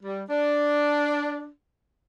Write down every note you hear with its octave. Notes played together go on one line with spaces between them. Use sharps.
G3
D4